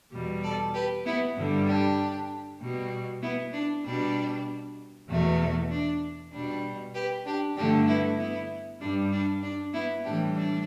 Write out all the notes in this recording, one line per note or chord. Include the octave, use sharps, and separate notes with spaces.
E2 B2 G3
A4 D5
G4 B4
B3 E4
G2 D3 G3
D4 G4
B2 G3
B3 E4
D4
B2 G3 D4
E2 B2 A3
D4
B2 G3 D4
G4 B4
D4 G4
G2 D3 A3 D4 G4
B3 E4
B3 E4
G2 G3 D4
D4
D4
B3 E4
A2 E3 G3 D4 G4
D4